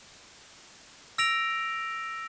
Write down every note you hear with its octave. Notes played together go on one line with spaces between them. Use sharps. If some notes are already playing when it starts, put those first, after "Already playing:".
E6 A#6 D7 F7